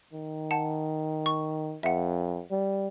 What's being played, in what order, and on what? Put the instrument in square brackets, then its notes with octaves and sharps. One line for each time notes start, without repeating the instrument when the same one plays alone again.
[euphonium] D#3
[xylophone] F#5 A5
C#6
[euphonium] F2 [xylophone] E5 F#5
[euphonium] G3